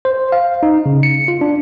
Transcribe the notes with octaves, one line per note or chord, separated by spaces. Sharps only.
C5
F5
D#4
C#3
C#7
F4
D4